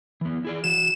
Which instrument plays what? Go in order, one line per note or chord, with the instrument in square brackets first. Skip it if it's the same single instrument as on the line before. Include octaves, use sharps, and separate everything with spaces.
[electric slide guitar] E3 B3
E4 G#4 D5
[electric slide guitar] E3 F#4 [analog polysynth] E7